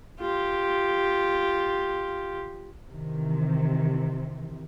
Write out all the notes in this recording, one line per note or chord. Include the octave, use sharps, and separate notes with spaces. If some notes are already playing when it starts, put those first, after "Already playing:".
F4 G4
C3 D#3 E3